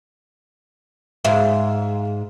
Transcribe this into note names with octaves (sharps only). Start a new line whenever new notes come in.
G#2 E5 F5